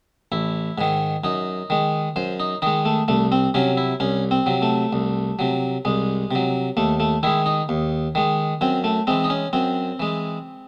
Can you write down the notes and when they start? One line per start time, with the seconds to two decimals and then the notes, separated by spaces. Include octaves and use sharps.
0.32 A1 E4
0.78 G#2 D#3
1.24 F#2 D#4
1.70 D#3 G#3
2.16 F#2 C5
2.40 D#4
2.62 D#3 G#3 D#4
2.85 A3
3.08 C2 A3
3.32 C4
3.54 C3 F#3 C#4
3.77 E4
4.00 C2 C#4
4.31 C4
4.46 C3 F#3
4.62 A3
4.93 C2
5.39 C3 F#3
5.85 C2 G#3
6.31 C3 F#3
6.77 D#2 A3
7.00 A3
7.23 D#3 G#3 E4
7.46 D#4
7.69 D#2
8.15 D#3 G#3
8.61 F#2 C4
8.84 A3
9.07 E3 G#3 C4
9.24 D#4
9.30 C#4
9.53 F#2 C4
9.99 E3 G#3